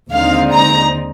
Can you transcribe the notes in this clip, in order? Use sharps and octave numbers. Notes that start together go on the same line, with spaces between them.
D#2 D3 G#3 C4 D#4 F5
A#5